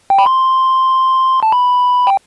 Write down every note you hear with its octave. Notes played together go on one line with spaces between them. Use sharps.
G5
B5
C6
A5
B5
G5